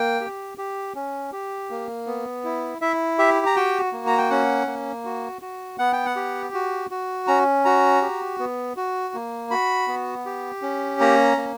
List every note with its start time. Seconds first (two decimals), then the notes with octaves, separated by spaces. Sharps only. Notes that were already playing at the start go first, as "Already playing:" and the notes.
Already playing: A#3 G5
0.21 G4
0.58 G4
0.95 C#4
1.32 G4
1.70 A#3
2.07 B3
2.45 E4
2.81 E4 E5
3.18 G4 E5
3.46 A#5
3.56 F#4 G5
3.93 A#3
4.07 A#5
4.18 G5
4.30 C#4 F#5
4.67 A#3
5.05 F#4
5.42 F#4
5.79 B3 F#5
5.93 G5
6.06 F#5
6.16 G4
6.54 F#4
6.91 F#4
7.27 C#4 A#5
7.65 F#4 A#5
8.02 G4
8.39 B3
8.77 F#4
9.14 A#3
9.51 F#4 B5
9.88 B3
10.26 G4
10.62 C#4
11.00 A#3 A#5
11.37 A#3